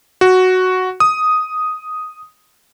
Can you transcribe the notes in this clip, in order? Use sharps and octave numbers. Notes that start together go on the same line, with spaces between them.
F#4
D#6